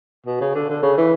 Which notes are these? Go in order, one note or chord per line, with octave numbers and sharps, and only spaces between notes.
B2
C#3
D3
D3
C#3
E3